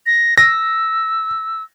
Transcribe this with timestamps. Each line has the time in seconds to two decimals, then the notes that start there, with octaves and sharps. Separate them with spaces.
0.06 A#6
0.38 E6 A#6